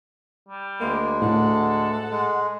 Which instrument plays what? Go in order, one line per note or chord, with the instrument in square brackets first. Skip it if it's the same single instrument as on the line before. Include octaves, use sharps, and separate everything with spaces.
[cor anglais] G3
[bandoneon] D2 G#3 [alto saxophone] A#3
[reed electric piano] A2 [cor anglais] A4 [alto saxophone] F#5
[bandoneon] G#3